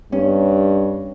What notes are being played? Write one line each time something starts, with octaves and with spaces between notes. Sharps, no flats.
G2 C#4